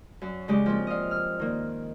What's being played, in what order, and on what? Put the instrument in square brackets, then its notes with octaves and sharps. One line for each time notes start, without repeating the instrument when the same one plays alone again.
[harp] F#2
C#3 G#3 G4
F3 A#3 C4
D#5 F5
F6
D#3 A#3